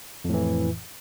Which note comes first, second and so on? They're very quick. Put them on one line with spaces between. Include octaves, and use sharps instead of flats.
F2 A2 E3